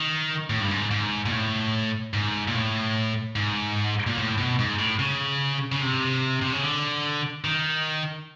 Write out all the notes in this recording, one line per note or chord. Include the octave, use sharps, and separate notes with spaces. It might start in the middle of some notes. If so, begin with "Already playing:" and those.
Already playing: D#3
A2
G2
G#2
G#2
A#2
A2
G#2
A#2
A2
G#2
A#2
A2
B2
G#2
A2
C#3
C#3
C3
C3
C#3
D3
D#3